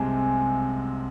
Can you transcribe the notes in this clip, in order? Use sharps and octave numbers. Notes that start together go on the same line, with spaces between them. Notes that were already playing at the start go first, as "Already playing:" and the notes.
Already playing: C2 C3 G#3 C4 G#5 A5